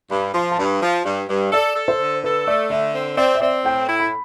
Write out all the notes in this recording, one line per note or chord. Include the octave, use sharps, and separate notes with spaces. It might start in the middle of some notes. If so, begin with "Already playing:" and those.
G2 B5
F3 C6
A5
G2 B5
F3
G2
G2
A4 D5
A4
C5
D3
A4 B4
A3 D5
D3 E5
C4
C4 D5
E5
C4 D5
A2 G5
E4
B5